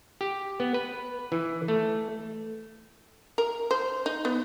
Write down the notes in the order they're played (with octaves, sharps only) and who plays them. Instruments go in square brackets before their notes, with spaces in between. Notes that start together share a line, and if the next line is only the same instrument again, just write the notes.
[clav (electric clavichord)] G4
B3
B4
E3
A3
[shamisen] A#4
C5
D#4
B3